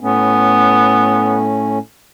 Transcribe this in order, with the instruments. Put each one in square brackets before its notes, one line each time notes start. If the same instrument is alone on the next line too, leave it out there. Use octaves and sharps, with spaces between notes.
[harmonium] A2 A3 C#4 [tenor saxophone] B3